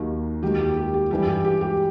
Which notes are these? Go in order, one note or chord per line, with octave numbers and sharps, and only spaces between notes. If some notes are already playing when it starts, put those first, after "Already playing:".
Already playing: D#2 D#3 F#3
D#2 D#3 F#3 G4
G4
G4
G4
G2 E3 G3 G4
G4
G4
G4